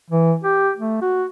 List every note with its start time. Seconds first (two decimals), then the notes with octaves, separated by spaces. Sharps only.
0.10 E3
0.44 G4
0.77 A3
1.02 F#4